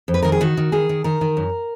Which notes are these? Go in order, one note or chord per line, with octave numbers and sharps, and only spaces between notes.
F2
B4
D#3 A#4
G#4
D#3 F#4
D#3
D#3 G#4
D#3
D#3 A#4
D#3
F#2